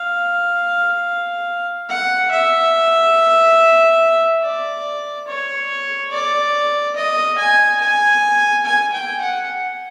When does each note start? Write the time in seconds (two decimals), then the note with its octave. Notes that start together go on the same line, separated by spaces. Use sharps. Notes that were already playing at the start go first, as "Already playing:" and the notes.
Already playing: F5
1.89 F#5
2.31 E5
4.42 D5
5.27 C#5
6.11 D5
6.95 D#5
7.38 G#5
7.80 G#5
8.65 G#5
8.92 G5
9.21 F#5